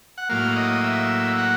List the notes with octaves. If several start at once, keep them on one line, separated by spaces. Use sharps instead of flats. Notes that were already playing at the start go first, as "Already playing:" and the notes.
F#5
A2 F#3 A#3 F5
D#5
E5
F#5